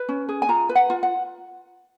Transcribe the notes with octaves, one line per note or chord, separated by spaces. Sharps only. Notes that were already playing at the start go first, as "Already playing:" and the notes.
Already playing: B4
C#4
G#4
G#5
F4 A#5
B4
F#5
F4
F#5